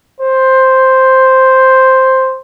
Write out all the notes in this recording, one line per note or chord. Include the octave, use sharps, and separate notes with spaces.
C5